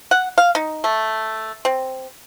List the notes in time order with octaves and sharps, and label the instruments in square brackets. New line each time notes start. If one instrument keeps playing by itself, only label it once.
[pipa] F#5
F5
D#4
A3
C4